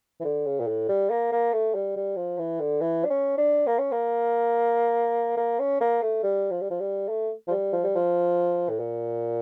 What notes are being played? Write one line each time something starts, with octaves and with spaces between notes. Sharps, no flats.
E3
D3
C#3
A#2
A2
G3
A#3
A#3
A3
G3
G3
F3
E3
D3
E3
D4
C#4
D4
A#3
C#4
A#3
A#3
C#4
A#3
A3
G3
F3
G3
F3
G3
A3
F3
G3
F3
G3
F3
A2
A#2